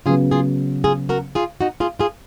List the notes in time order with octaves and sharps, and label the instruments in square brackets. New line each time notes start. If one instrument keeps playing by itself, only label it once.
[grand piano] C#3 F#3 B3 [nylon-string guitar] F4 G#4
[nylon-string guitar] F4 G#4
F4 G#4
F#4 A#4
F4 G#4
D#4 F#4
F4 G#4
F4 G#4